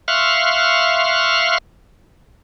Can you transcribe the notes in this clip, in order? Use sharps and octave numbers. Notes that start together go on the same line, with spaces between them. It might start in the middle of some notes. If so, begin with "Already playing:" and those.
E5 F5 C6 C#6 F6 F#6